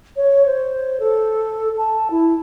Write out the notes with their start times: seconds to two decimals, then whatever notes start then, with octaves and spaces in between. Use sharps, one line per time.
0.17 C#5
0.46 C5
1.00 A4
1.77 A5
2.11 E4